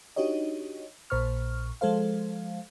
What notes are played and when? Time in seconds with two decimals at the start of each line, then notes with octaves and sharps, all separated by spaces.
0.16 D4 D#4 F#4 G4 C#5 D#5
1.10 A#1 A#2 C5 C#6 F6
1.81 F3 G#3 A4 C5 F5